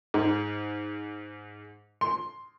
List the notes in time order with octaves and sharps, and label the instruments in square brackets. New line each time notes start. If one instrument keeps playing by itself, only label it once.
[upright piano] G#2
C6